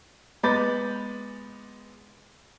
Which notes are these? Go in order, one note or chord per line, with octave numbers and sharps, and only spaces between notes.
G#3 B3 B5 D6 G6 A6